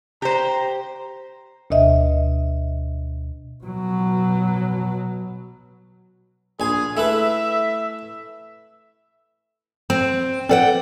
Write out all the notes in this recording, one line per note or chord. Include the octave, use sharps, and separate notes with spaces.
G4 C5 A#5
D2 B2 D#5 E5
B2 F#3
A#1 G#4 G#5
A3 E4 B4 E5
C4
C4 A4 B4 D5 F#5 G5